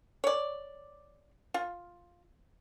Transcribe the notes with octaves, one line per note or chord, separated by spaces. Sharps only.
C#5 D5
F4